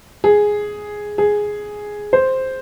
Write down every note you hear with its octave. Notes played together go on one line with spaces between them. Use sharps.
G#4
G#4
C5